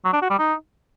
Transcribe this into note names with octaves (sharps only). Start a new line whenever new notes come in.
F#3
D4
F#4
G3
D#4